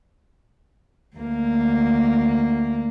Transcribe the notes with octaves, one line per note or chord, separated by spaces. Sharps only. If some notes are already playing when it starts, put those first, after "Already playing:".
D2 A#3